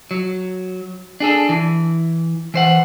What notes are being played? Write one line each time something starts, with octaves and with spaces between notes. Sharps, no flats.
F#3
D4 G#4 A4
E3
E3 C5 F#5